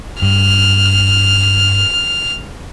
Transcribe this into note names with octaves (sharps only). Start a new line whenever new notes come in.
G2 F6